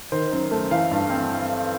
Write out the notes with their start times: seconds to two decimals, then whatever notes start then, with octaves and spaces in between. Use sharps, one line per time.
0.12 D#3 C5
0.32 F#2
0.51 A3
0.71 E3 F5
0.91 G2
1.10 C4